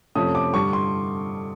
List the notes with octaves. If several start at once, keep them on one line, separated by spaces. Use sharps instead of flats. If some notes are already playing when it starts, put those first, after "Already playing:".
F2 C3 F3 A3 C#4 D#6
D6
G2 D3 G3 C#6
C6